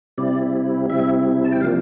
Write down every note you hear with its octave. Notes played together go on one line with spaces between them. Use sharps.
C3 G3 C4 E4 D5
C3 G3 C4 E4 E5
A5
G5
C3 F3 A#3 D4 F5